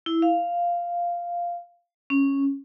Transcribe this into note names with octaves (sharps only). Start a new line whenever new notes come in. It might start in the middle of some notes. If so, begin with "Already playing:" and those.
E4
F5
C#4